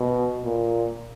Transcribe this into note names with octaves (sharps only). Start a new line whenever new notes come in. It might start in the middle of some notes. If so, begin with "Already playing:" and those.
Already playing: B2
A#2